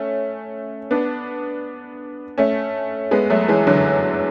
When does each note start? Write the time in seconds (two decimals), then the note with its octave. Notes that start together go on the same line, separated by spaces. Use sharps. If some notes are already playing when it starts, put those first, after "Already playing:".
Already playing: A3 C#4
0.91 B3 D4
2.38 A3 C#4
3.11 G#3 B3
3.30 F#3 A3
3.48 E3 G#3
3.67 D3 F#3